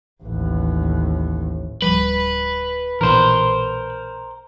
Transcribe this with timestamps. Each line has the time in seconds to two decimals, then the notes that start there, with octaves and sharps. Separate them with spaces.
0.23 A1 D#2
1.82 D1 F3 G3 B4
3.01 A#1 B2 E3 A#4 C5